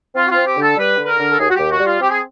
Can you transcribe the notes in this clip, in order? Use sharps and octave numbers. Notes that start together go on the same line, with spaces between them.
C4 F4
F#4
F4
C4
G4
D3 A4
G3 B4
D3
B4
A#4
D3
A4
D#2 G#4
F#4
D#2 G4
F#4
G3
F4
C4 G4
G#4